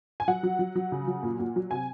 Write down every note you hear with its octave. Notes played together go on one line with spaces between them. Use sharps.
G#5
F#3 F#5
F#3
F#3
F#3
C#3
F#3
A#2
A#2
F#3
C3 G#5